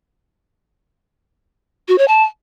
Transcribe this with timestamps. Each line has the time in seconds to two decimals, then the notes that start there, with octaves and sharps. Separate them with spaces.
1.88 F#4
1.98 C#5
2.08 A5